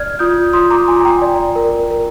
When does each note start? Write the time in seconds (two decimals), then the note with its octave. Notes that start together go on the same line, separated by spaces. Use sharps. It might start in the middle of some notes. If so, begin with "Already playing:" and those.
Already playing: D5 F6 G#6
0.19 F4 D#6 G6
0.53 F4 C6 D#6
0.71 A#5 D6
0.88 F4 G#5 C6
1.05 G5 A#5
1.22 D5
1.56 A#4
1.91 A#4